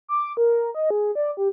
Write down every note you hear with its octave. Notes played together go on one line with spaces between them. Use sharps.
D6
A#4
D#5
G#4
D5
G4